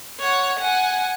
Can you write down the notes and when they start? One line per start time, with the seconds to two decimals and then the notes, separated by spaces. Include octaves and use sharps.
0.20 C#5 F#5
0.59 F#5 G#5